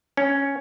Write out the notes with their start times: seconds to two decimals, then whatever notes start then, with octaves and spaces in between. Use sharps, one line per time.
0.17 C#4